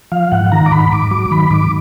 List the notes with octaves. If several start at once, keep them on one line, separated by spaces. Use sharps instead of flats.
F3 F5
G#2 F#5
D#3 A#5
D6
G#2 B5
G#2 D6
F#3 D6
D#3 B5
G#2 D6